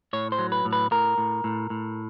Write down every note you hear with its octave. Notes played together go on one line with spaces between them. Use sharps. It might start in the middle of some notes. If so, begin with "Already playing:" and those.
A2 C#5
C5
F#3
B4
A2
B4
A2 A#4
A2
A2
A2